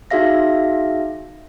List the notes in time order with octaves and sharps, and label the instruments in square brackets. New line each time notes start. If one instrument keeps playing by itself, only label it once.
[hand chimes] D#4 F#4 G#4 E5 F5 A#6